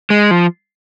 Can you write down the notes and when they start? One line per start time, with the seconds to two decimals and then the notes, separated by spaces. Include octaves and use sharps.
0.10 G#3
0.31 F3